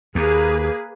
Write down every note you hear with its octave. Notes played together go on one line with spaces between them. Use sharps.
D#2 A#3 G#4 B4